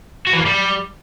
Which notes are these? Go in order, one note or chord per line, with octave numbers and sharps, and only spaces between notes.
F#4
E3
A#3
G3